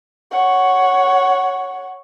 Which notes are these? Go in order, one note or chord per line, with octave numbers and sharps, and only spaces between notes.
C#5 F#5